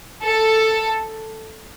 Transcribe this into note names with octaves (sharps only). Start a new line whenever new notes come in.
A4